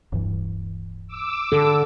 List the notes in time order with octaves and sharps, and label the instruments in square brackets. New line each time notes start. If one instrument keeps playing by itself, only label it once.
[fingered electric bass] D1 G2 E3
[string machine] D6 E6
[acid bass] D3 [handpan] A4